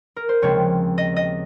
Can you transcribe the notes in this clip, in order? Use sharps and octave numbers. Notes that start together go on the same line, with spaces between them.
A#4
C5
D#2 C#3 F3 G#3 C4 C#5
D#5
D#5